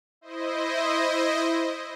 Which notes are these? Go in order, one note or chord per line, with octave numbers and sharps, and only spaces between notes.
E4 C5 D#5